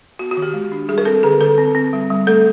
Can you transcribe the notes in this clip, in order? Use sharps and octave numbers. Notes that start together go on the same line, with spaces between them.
B3 F#4
F#4
D#3
G4
G#3
D4
G3 G#4
A#4
C4 A4
D3 G#4
D3 A4
C4
C4
G3
G3
A3 A4